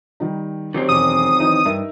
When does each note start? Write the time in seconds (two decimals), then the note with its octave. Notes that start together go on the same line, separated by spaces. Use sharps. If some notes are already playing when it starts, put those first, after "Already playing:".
0.20 D#3 G3 D#4
0.74 D#3 F#3 C4 G4
0.89 E1 D6 D#6
1.40 E3 D#4
1.65 G2 D#4 A#4 E5